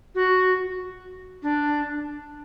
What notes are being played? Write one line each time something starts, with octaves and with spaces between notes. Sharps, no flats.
F#4
D4